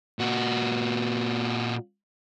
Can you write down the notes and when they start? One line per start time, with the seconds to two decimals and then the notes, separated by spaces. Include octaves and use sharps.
0.19 A#2 F#4